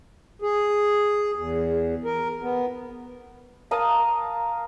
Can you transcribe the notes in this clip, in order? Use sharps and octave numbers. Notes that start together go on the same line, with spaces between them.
G#4
E2
A#4
B3
A#4 F5 A5 D#6